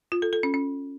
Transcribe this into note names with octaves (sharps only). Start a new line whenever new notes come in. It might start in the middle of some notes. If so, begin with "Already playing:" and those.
F4
A4
A4
C#4
C#4